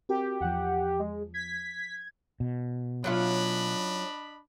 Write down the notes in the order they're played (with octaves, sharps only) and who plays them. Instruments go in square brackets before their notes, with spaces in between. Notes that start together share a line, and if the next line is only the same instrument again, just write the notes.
[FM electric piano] C4 F#4 A#4 [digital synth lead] G4
[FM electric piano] E2 F3 [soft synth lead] F#5
[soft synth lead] G#3
[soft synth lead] G#6 [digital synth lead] B6
[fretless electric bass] B2
[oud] F#3 C#4 F4 [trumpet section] D4 D#5 B5